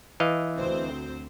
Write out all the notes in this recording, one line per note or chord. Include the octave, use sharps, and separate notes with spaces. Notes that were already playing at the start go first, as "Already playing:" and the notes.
E3 D#5 F5
D2 C4 C5